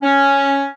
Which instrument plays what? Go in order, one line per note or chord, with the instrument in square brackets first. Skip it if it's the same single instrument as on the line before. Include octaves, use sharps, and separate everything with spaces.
[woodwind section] C#4